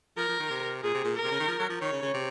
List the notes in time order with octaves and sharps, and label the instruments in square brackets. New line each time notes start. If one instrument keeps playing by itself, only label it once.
[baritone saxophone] F3 [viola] A#4
[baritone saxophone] F3
D#3
C3
[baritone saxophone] A#2 [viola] G#4
[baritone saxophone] C3
A#2
[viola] A#4
[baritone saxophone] C3
C#3
D#3
F3
F#3
F3
[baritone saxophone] D#3 [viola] C#5
[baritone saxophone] C#3
C#3
C3